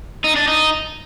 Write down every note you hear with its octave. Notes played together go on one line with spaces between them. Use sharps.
D#4
D4
D#4